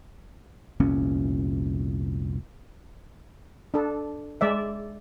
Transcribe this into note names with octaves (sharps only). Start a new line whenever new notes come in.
F1 C2 A#2 C#4
D4 A4
G#3 D5 E5